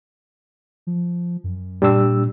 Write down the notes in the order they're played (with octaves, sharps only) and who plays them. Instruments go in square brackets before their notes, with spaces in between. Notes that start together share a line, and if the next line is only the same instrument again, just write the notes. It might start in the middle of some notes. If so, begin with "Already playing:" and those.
[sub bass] F3
F#2
[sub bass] A#2 [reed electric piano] G3 D4 E6